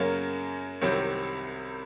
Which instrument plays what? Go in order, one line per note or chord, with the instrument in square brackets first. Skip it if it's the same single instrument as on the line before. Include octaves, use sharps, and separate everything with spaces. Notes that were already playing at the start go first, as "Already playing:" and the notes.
Already playing: [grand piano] F#2 C#3 F#3 A#3
C2 C3 D#3 F#3 C4